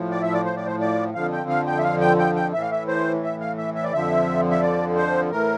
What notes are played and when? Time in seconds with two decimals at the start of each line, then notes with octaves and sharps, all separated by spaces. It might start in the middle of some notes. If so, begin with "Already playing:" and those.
Already playing: A2 F3
0.11 D5
0.22 E5
0.33 D5
0.45 C5
0.56 D5
0.66 C5
0.80 D5
1.14 F2 D3 F3 F5
1.32 G5
1.49 F5
1.66 G5
1.78 E5
1.83 F5
2.01 G5
2.19 G5
2.36 G5
2.53 A2 E3 E5
2.62 F5
2.71 E5
2.88 C5
3.23 E5
3.40 F5
3.58 E5
3.75 E5
3.84 D5
3.93 F2 D3 F3 E5
4.50 E5
4.61 D5
4.96 C5
5.31 A2 E3 A#4